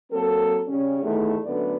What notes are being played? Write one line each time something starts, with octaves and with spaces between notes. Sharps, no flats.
F#3 A#3 C4 A4 A#4
C#3 G3 C#4
E2 D#3 A3
F#2 D3 A3 B3 D5